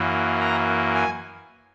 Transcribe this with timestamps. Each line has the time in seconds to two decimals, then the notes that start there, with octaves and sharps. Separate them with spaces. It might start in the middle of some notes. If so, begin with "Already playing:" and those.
Already playing: F#2 E3 A#3
0.41 A#5
0.94 G#5